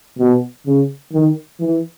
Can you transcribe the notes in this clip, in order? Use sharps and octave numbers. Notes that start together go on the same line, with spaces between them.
B2
C#3
D#3
E3